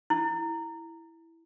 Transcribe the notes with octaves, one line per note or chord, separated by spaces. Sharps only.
E4